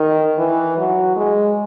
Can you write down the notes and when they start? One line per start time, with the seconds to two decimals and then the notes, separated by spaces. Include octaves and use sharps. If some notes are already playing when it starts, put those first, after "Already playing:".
Already playing: D#3
0.38 E3
0.78 F#3
1.16 G#3